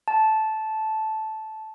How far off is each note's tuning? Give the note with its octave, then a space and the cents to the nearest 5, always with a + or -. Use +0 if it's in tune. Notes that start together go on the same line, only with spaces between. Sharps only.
A5 -10